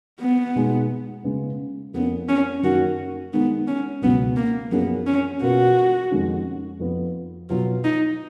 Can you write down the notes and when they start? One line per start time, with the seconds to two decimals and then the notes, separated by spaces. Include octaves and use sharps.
0.20 B3
0.56 B2 G#3 D#4 G#4
1.24 C#3 G#3 B3
1.94 F2 F3 A#3 B3 C#4
2.29 C#4
2.63 F#2 D#3 A#3 F#4
3.33 D#3 G#3 B3 D#4
3.67 C#4
4.02 C#2 B2 F#3 B3 C#4
4.37 A#3
4.71 F#2 F3 A#3 B3 C#4 G#4
5.07 C#4
5.42 B2 A#3 F4 F#4 B4
6.10 F2 D#3 G#3 C#4 F#4
6.80 F2 F3 B3
7.49 B2 F#3 B3 F4
7.84 D#4